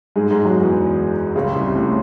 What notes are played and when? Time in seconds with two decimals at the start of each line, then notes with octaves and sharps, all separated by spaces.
0.16 G#2 G#3
0.31 G#2 G#3
0.45 F#2 F#3
0.60 E2 E3
1.35 C#2 C#3
1.55 C2 C3
1.75 A2